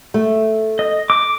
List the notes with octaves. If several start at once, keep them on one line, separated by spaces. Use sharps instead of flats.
A3
D#5
D6